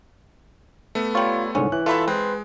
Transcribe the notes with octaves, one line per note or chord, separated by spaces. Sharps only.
A3 B3
G3 F4 C#5
C2 G#2 D3 C#4
E3 F#6
B2 A3 F4 A4 E5 B5
G#3 C4 B4